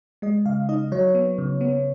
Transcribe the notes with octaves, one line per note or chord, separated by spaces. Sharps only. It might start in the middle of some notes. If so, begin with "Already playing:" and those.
G#3 D#5
C#3 F5
D#4 D#5
F#3 C#5
B3
C#3
B3